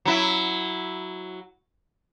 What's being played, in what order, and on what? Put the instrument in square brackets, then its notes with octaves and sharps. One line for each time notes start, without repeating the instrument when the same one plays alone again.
[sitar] F#3 E4